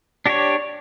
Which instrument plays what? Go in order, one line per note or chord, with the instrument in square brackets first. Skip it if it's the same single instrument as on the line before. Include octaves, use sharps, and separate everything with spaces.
[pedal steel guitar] D4 G4 C#5